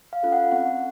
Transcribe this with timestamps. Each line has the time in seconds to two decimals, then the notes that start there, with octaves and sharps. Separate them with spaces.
0.13 F5
0.23 C#4 F4 A4
0.32 F#5
0.52 C4 F#5